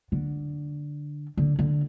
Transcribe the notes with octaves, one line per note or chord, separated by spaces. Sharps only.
D3
D3
D3